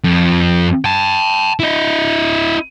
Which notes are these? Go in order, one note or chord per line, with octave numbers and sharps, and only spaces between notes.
F2
G5 A5
E4 D#5